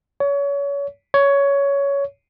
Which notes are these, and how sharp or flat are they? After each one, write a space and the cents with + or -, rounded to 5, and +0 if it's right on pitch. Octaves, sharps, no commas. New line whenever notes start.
C#5 +30
C#5 +15